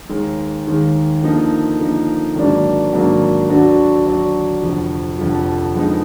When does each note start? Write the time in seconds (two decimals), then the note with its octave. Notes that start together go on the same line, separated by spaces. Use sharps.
0.09 D#2 D#3 G#3
0.67 D#2 D#3 G#3
1.22 D3 F3 A#3 D#4
1.79 D3 F3 A#3 D#4
2.35 G#1 G#2 F#3 A#3 D4
2.92 G#1 G#2 F#3 A#3 D4
3.49 D2 D3 F#3 D4 F#4
4.05 D2 D3 F#3 D4 F#4
4.62 F1 F2 D3 F3
5.19 F1 F2 D3 F3
5.75 F2 D3 G#3 B3 D#4